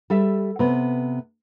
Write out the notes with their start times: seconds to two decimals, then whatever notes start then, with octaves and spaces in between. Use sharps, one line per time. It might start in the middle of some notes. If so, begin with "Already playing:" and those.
0.10 G3 A4 E5
0.59 C3 B3